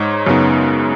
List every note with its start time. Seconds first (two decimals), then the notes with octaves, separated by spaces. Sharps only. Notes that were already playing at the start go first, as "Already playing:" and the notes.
Already playing: G#2 G#3 D#4 C#5
0.26 F#2 C#3 B3 D#4